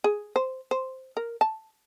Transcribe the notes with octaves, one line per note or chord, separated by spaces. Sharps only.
G#4
C5
C5
A#4
A5